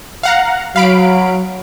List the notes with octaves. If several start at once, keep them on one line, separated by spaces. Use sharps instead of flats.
F5 F#5 A#5
F#3 F5 B5 D7